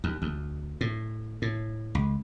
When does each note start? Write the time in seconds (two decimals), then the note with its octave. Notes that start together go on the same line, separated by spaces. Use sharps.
0.04 D#2
0.22 D2
0.81 A2
1.42 A2
1.95 C#2